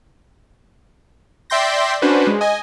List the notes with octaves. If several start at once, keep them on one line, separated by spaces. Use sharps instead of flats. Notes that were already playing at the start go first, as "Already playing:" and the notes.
D5 E5 G5 C6 G6 A#6
C#4 D4 F#4 B4 C5
G#3
D#5 G#5